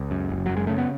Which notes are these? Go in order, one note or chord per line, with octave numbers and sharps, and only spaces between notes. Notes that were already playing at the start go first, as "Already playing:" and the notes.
Already playing: C#2
F#2
F#1
F#2 F#3
G#3
C#3 A3
B3